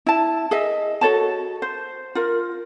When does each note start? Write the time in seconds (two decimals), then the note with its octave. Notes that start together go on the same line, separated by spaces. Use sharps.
0.07 E4 A5
0.51 G#4 D#5 E5
1.01 F#4 A4 C#5 A5
1.62 C5
2.15 F4 A#4